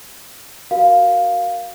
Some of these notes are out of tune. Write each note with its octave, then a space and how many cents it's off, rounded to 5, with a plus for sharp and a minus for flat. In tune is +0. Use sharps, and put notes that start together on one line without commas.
F#4 +0 A#4 +0 F5 +5